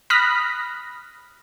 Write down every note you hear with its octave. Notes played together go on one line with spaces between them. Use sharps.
B5 D#6 F6 F#6 A#6 B6